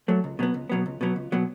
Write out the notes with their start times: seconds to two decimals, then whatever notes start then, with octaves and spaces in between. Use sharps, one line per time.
0.08 F#3 A3
0.24 C#2
0.39 B2 F#3 B3
0.54 C#2
0.70 B2 F#3 B3
0.86 C#2
1.01 B2 F#3 B3
1.16 C#2
1.32 B2 F#3 B3